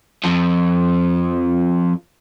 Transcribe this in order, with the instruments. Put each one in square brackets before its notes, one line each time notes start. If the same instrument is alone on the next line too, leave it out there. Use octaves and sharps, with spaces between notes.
[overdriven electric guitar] F2 F3